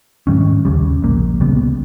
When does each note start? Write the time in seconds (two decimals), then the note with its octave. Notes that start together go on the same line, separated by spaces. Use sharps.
0.27 G#2 D#3 G3 C#4
0.65 D#2 C#3 G3
1.02 A#1 A#2 A#3
1.40 C#2 C#3 G3 B3